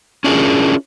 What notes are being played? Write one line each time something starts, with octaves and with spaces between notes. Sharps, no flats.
C#4 D4 E4 F4 G#4 A#4